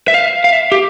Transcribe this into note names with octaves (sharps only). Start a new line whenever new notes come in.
E5
F5
F5
E5
G4